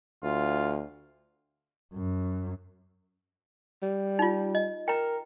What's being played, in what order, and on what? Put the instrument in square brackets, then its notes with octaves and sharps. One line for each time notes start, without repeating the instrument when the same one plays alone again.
[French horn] D2 [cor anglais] F4
[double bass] F#2
[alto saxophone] G3
[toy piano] D#4 F4
D#5
[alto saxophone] A#4 [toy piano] G5 A#5